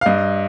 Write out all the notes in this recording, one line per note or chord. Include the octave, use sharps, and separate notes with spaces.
F5
G2 D#5